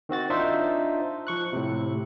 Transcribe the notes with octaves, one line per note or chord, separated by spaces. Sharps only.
D#3 C4 F#4 A6
D4 D#4 F4 C5 E5
F3 C#6 F#6
A2 C3